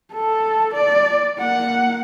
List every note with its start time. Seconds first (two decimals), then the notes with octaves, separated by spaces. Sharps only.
0.14 A4
0.74 D5
1.40 A#3 F#5